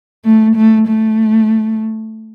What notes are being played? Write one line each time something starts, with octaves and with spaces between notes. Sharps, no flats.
A3
A3
A3